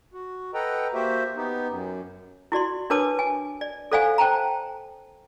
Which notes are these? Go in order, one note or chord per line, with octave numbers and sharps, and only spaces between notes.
F#4
A4 B4 D#5 F#5 G5 A#5
A#3 F#4 G4 C5 E5
B3 D#4 G4
F#2
E4 F#4 D5 C6
D4 A#4 B4 C#5 A5 D6
G#5
D5
A4 C5 D5 F5 F#5 G#5
C5 G5 A5 A#5